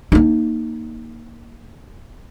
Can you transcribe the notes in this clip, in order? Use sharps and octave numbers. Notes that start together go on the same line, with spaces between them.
A#3 D#4